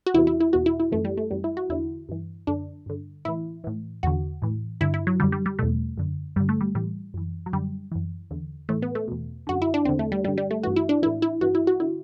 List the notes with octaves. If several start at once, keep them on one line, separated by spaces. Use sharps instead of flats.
F#4
E2 C3 E3 E4
E4
E4
E2 B2 F#4
E4
E4
F#2 E3 A3
G3
A3
F#2 E3 G3
E4
F#4
E2 D3 E4
G2 E3
F#2 D3 D4
G2 D3
A2 E3 E4
A2 E3
E2 D3 F#4
A2 E3
G2 D3 E4
E4
F#3
F#2 D3 G3
G3
G3
E2 B2 A3
F#2 D3
G2 D3 G3
A3
G3
A2 E3 G3
F#2 E3
F#3
F#2 D3 G3
F#2 E3
E2 D3
A2 E3 A3
B3
A3
E2 B2
F#2 D3 F#4
E4
D4
E2 D3 C4
A3
G3
G2 D3 G3
G3
A3
G2 E3 F#4
E4
D4
A2 E3 E4
E4
G2 E3 F#4
E4
F#4
D3 E4